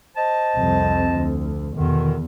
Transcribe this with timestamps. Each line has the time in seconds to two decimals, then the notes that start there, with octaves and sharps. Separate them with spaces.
0.17 C5 D#5 A5
0.55 C2 F2 C4
1.13 D2
1.76 E2 B2 D3 D#3